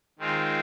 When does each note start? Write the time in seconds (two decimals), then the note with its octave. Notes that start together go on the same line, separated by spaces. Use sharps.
0.19 D#3 G#3 C4 F4